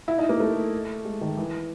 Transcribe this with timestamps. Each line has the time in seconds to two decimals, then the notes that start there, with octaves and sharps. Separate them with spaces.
0.08 E4
0.18 D#4
0.29 A#3
0.40 A3
1.05 G#3
1.21 D#3
1.37 E3